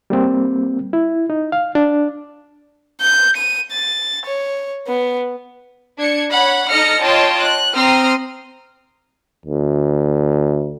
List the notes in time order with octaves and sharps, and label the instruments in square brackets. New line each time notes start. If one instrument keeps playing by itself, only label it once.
[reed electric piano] G3 A#3 C4
E4
D#4
F5
D4
[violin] G6
D#7
A6
C#5
B3
[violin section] D4 G#6 C#7
C#5 F#5 B5
D#4 A4 D#5 F6 A#6 C#7
F4 C#5 D#5 G5 A5 C6
F#6
C4 A#5 C6 D#6 F6
[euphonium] D2